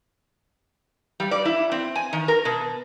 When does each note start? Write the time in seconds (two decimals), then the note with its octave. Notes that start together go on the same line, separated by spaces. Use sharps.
1.20 G3
1.31 D5
1.45 E4
1.72 C4
1.96 G#5
2.13 D#3
2.28 A#4
2.45 B2